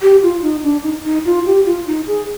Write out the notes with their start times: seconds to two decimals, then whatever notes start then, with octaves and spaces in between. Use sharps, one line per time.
0.02 G4
0.23 F4
0.42 D#4
0.63 D4
0.83 D#4
1.04 D#4
1.25 F4
1.46 G4
1.66 F4
1.87 D#4
2.07 G#4